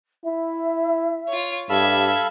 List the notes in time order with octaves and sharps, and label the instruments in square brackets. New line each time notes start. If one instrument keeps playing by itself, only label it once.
[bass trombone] E4 [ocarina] E5
[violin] F4 C#5
[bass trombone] G2 [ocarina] G4 [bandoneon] A4 F5 B5 [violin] E5 G#6